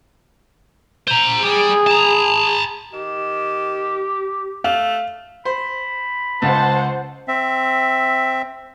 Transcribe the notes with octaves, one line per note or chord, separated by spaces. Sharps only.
C5 A#5
G3 G4 G#4
A5 A#5
D#3 G4
A3 F5
C5 B5
C#2 C5 F#5 A5
C4 E5